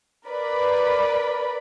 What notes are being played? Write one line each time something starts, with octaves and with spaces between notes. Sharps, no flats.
A#4 B4 D5 B5